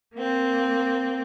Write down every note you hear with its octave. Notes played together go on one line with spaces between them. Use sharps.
A#3 C4